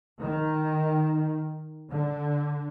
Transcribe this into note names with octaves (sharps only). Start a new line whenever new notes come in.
D#3
D3